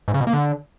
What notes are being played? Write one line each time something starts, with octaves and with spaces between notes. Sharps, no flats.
G#2
C#3
B2
A#3
D3